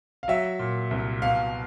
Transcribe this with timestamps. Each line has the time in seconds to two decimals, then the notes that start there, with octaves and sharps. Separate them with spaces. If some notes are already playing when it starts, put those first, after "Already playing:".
0.23 F5
0.28 F#3 E5
0.59 A#2
0.91 C2
1.22 B2 F5